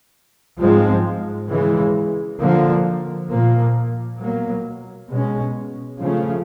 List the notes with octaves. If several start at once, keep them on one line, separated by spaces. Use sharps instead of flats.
G#2 F3 G#3 C4
C#3 E3 G#3
D3 F3 A#3
A#2 F3 A#3
B2 F#3 A#3
B2 G#3 C#4
C#3 F3 A3 C#4